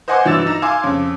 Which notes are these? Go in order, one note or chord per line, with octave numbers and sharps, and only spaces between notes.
C5 D#5 F#5 G#5 C6 D6
G2 E3 F#3 E6 A6 E7
D#4 A#5 E7
F5 G#5 C6 D6
F2 C#3